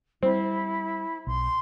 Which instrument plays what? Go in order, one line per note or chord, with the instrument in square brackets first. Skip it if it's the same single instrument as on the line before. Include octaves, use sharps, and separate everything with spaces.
[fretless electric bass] G3 [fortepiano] C4 [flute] E4
[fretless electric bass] B1 [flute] C6